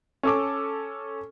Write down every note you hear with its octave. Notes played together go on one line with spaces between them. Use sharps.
C#4 A4 D6